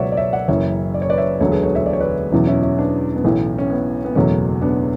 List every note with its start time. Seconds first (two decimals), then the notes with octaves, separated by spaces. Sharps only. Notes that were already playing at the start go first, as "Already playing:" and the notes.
Already playing: C#2 B2 F#3 B4 C#5 D5 E5 F#5
0.12 D5
0.17 C#5 E5
0.33 D5 F#5
0.48 F#1 F#2 E3 C#5 E5
0.94 D5
1.02 C#5
1.10 B4 D5
1.18 C#5 E5
1.40 E1 D2 D3 F#3 A4 C#5
1.52 G#4 B4
1.63 A4 C#5
1.75 C#5 E5
1.86 D5
1.93 C#5
2.00 B4 D5
2.32 E2 B2 F#3 C#4 E4
2.47 C#4 E4
2.62 C#4 E4
2.78 B3 D4
3.16 B3
3.24 B1 A2 E3 A3 C#4
3.58 C#4
3.70 B3
4.05 B3
4.15 F#1 E2 B2 F#3 A3 C#4
4.61 B3 D4